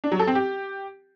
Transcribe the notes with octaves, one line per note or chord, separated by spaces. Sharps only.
D4
F#3
A4
C4
G4